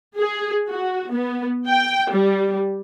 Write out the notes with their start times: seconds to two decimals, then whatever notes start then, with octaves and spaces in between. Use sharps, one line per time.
0.19 G#4
0.69 F#4
1.11 B3
1.67 G5
2.12 G3